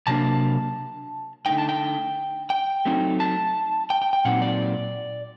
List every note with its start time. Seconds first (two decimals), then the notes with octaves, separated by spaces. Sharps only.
0.07 C3 F#3 A#3 D4 A5
1.46 D3 A3 D#4 G5
1.58 A5
1.69 G5
2.50 G5
2.85 F#3 A3 C4 D#4
3.20 A5
3.90 G5
4.02 G5
4.13 G5
4.25 A#2 F#3 C4 D#4 F#5
4.42 D5